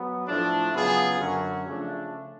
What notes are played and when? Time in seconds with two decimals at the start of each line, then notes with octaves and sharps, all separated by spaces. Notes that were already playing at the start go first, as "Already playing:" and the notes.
Already playing: F#3 B3
0.28 A2 F3 A3 D4
0.74 C#3 F#3 B3 F4 G#4
1.20 F#2 D3 F#3 C#4 F#4
1.67 C#3 F3 A3 D4